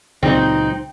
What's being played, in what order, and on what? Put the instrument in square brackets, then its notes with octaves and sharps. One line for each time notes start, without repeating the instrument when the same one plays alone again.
[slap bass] C#2 A#2 F#3 [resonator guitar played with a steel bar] C4 [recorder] D#4